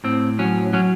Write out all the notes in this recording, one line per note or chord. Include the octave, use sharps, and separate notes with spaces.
A2 C4
F#3 C#4
F#3 C#4